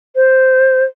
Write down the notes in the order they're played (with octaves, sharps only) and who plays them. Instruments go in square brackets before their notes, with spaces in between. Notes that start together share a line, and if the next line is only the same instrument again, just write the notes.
[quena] C5